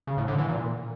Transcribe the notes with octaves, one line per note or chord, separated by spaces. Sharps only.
C#3
A2
D3
E3
A#2